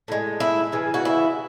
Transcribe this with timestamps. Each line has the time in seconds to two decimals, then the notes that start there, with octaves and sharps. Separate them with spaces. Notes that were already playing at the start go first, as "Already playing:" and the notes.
0.08 A2 G#3
0.40 E4
0.72 C#3 E3 G#3
0.94 F#4
1.05 E4